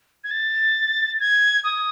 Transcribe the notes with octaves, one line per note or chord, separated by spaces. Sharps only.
G#6
A6
G#6
D#6